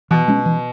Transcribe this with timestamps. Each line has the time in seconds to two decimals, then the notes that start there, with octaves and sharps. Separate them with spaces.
0.11 B2 E3
0.28 G#3 C#4
0.46 E3